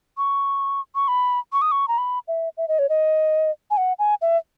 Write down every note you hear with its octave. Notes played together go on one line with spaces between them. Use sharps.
C#6
C#6
B5
C#6
D#6
C#6
A#5
B5
E5
E5
D#5
C#5
D#5
G#5
F#5
G#5
E5